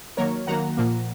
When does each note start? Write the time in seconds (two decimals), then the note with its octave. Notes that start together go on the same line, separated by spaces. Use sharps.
0.17 D#3 F#3 A#3 A#4 C#5
0.47 D#3 F#3 A#3 F#5 A#5
0.77 A#2 F3 A#3